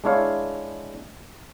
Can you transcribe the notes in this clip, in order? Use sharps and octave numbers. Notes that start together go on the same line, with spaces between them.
G#3 D4 E4 C#5 F5